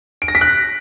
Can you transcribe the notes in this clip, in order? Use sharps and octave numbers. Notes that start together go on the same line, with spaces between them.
D7
A#6
B6
F#6